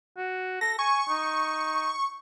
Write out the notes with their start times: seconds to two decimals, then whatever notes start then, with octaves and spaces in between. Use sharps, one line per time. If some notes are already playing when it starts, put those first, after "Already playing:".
0.18 F#4
0.61 A4 A#6
0.79 G#5 C#6
1.09 D#4